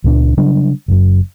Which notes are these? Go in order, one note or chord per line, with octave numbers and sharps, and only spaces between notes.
C#2 A#2 G3 D4
C#3 F#3 G3 D4
F#1 F#2